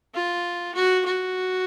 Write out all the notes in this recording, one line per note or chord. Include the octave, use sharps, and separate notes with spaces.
F4
F#4
F#4